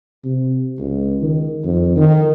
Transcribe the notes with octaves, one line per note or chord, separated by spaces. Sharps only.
C3
C#2
D#3
F2
D#3